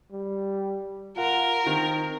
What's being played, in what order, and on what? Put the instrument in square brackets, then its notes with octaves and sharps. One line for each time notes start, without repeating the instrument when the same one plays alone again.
[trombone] G3
[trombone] F4 [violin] A#4 [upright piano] F#5
[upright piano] D#3 [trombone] C4